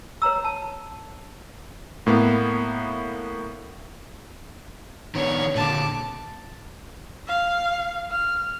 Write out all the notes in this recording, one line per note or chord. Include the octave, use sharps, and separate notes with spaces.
B4 C#5 A#5 E6
A5
A2 A#3 B3
D#3 B3 D4 C#5
A#2 D3 A5 D6
F5
F6